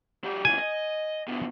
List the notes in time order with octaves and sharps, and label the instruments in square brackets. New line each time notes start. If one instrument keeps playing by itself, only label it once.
[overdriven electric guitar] F#3 G4
[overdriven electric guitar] A#2 E3 [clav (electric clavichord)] G#5
[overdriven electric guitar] D#5
D2 B2